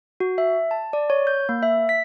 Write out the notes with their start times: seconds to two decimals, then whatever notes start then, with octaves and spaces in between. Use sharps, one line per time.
0.20 F#4
0.38 E5
0.71 A5
0.93 D5
1.10 C#5
1.27 G6
1.49 A#3
1.63 E5
1.89 B6